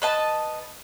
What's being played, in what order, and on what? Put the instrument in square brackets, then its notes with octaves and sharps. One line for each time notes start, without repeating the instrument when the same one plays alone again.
[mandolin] B4 D#5 A5